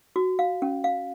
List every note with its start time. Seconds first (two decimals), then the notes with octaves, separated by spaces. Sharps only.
0.16 F#4
0.39 F5
0.62 C#4
0.84 F5